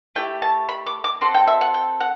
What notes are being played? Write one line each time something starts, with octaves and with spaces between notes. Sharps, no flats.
A3 E4 G4 G5
A5
B5
D6
D6
C4 F#4 A4 C6
G5
E5
F#5
G5
F#5